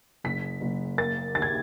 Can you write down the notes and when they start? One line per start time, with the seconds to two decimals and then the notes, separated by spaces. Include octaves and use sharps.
0.24 F#1 B6
0.61 F#1
0.98 A#3 A6
1.35 D#2 A6
1.42 G#6